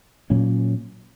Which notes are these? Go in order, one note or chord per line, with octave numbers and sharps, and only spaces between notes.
A#2 F#3 A#3 C#4